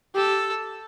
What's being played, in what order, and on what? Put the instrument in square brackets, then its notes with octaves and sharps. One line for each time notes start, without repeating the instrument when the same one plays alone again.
[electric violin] G4 [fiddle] A4